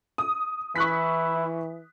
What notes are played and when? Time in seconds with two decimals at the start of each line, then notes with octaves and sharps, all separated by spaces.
0.18 D#6
0.76 E3 E4 C#6 F#6 B6